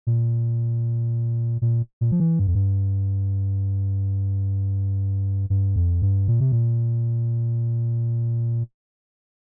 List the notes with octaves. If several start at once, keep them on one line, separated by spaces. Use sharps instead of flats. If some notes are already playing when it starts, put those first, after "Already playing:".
A#2
A#2
A#2
F3
E3
G2
F2
G2
G2
F2
G2
A#2
C3
A#2